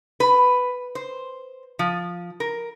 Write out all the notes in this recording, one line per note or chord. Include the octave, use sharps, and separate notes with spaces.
B4
C5
F3
A#4